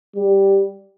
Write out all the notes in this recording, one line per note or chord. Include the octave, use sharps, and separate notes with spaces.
G3